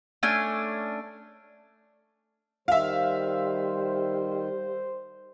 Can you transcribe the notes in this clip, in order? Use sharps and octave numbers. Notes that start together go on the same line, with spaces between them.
A3 C#4 D4 G#5
D#3 G3 C5 E5 F5